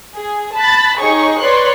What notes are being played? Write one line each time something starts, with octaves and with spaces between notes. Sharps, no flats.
G#4
A5 B5 F#6 A6
D#4 G4 G#4 C#5 C#6
B4 C#5 D5 C6 C#6 F#6